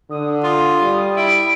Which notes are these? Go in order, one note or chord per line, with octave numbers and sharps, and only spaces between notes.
D3 D#6
F4 D#6
G3
E4 D7